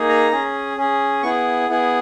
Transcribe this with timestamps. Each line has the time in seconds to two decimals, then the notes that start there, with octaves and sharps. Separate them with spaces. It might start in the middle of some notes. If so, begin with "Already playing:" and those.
Already playing: A#3 D#4 G#4
0.09 A#5
0.32 C#4 G#4
0.77 C#4 G#4
1.23 B3 E4 G#4 C#6
1.69 B3 E4 G#4